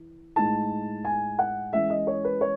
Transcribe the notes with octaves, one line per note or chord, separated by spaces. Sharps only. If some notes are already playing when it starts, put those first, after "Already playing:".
Already playing: E3
A2 G#3 D#4 A5
G#5
F#5
E3 G#3 C#4 E5
D#5
C#5
B4
C#5